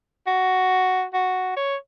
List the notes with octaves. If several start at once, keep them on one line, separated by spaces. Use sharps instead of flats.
F#4
F#4
C#5